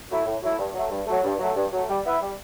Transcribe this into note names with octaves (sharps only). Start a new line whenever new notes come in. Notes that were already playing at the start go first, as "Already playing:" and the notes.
F#3 A3 E4
A2
F#3 A3 E4
G2
F#3 A3
G2
F#3 A3
G2
F#3 A3
G2
F#3 A3
G3
B3 E4 B4 E5
G3